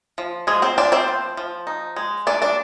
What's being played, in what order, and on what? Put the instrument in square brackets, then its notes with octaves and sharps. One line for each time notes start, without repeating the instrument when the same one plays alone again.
[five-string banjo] F3
F3 G#3 G#4
C4 C5
F3 D4 D5
C4 C5
F3
F3
D#4
G#3
D#3 D4 D5
D4 D5